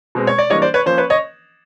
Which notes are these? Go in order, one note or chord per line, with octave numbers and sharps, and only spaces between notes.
B2 G#3 C4
C#5
D5
E3 G3 A#3 D4 C#5 D#5
C5 D5
B4 C#5
F3 A#3 C#4 C5
B4 C#5
C#5 D#5